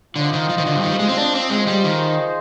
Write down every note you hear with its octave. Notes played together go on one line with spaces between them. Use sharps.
D3 F4 C5 D#5
D#3
F3
D#3
D3
G2
D#3
G3
G#3
C4
D4
C4
G#3 F4 G#4 C5 D#5
G3
D#3